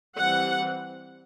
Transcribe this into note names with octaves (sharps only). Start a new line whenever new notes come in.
E3 G3 C4 F#5